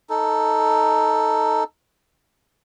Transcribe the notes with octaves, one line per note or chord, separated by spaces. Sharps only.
D#4 A4